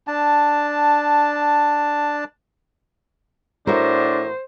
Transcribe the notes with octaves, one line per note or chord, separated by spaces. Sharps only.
D4 A5
A2 D4 F#4 A#4 C5